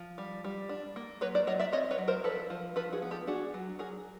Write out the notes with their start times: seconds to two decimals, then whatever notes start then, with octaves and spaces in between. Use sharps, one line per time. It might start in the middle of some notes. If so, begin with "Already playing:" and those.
Already playing: F3
0.18 G3
0.44 G3
0.69 D4
0.96 A#3
1.21 F#3 B4 C#5
1.35 C5 D5
1.47 F#3 C#5 D#5
1.60 D5 E5
1.72 C4 C#5 D#5
1.91 B4 C#5
1.98 F#3
2.08 A#4 C5
2.24 F3 A4 B4
2.50 F3
2.76 F3 A4 B4
2.93 F#4 G#4
3.02 B3
3.11 G4 A4
3.27 D4 F#4 G#4
3.54 F#3
3.79 F#3 G#4 A#4